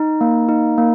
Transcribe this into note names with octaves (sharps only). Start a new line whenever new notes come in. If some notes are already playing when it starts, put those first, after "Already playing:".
Already playing: D#4
A#3
D#4
A#3